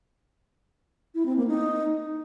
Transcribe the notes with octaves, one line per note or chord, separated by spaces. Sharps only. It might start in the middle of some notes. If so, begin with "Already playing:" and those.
E4
C4
A#3
D#4